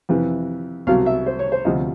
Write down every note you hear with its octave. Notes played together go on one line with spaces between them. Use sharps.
F2 C3 E3
C2 B2 F#3 F5
E5
C5
C#5
C5
D2 C3 F3 D#5